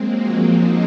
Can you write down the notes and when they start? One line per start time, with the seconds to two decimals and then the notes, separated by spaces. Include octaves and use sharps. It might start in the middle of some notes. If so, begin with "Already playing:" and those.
Already playing: F#3 G#3 A#3 C4
0.16 F3 G#3
0.44 C4 D#4